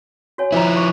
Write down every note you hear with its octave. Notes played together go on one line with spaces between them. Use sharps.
F#4 C#5 G#5
F3 E4 C5 D#5 A#5
C#6